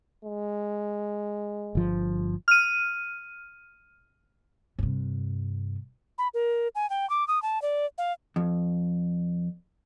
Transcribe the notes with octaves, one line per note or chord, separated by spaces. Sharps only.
G#3
G1 F3
F6 D#7
G2 C3
B5
A#4
G#5
G5
D6
D#6
A5
D5
F5
F2